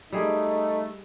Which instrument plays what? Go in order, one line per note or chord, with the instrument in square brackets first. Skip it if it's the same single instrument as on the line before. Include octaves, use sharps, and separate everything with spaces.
[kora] G3 G#4 D#5 [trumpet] A3 [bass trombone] D#4